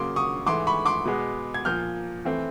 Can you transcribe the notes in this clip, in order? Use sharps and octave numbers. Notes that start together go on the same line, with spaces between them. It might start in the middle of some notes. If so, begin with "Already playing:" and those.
Already playing: C#3 F#3 A#3 C6 D6
C#6 D#6
G#2 E3 A3 C6 D6
B5 C#6
C6 D6
B2 G#3 B3
G#6
A#2 F3 A#3 F6 G6
E3 A3 C4